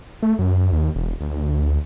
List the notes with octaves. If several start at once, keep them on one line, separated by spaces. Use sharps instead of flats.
A3
F#2
D#2
E1
D2